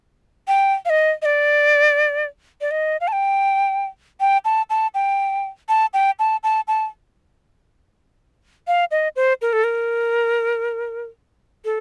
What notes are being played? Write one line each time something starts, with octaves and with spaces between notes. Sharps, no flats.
G5
F5
D#5
D#5
D5
D5
D#5
F5
A5
G5
G5
A5
A5
G5
A5
G5
A5
A5
A5
F5
D#5
C5
A#4
A4
A#4
A4